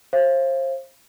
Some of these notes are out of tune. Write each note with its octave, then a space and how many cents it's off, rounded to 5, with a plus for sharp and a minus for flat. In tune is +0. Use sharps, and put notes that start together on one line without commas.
C5 +30 F5 -35